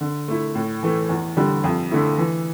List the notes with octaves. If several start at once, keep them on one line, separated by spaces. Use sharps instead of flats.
D3
A3 E4
A2
E3 A3
E2
D3 G3
F2
D3 A3 E4
E3